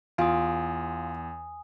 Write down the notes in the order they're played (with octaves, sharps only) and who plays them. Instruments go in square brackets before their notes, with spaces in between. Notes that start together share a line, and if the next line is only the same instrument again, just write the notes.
[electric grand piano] E2 [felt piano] F4 [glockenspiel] G#5 D#6